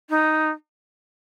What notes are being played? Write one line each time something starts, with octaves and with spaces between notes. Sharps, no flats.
D#4